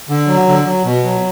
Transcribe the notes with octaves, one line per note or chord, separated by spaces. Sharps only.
D3
F#3
D3
F#3
B2
F#3